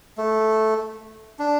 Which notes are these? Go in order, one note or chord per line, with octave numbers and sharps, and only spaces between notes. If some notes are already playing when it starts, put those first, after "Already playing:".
A3
D4